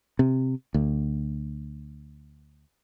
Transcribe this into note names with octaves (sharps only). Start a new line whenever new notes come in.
C3
D2